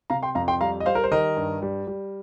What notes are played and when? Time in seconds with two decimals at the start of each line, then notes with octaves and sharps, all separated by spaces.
0.10 C3 F5 A#5
0.23 G5 C6
0.35 F2 F5 A#5
0.48 G5 C6
0.61 G3 F5 A#5
0.80 D#5
0.86 G3 C5 F5
0.95 A#4
1.04 C5
1.11 D#3 A#4 D#5
1.37 G2
1.62 G3
1.87 G3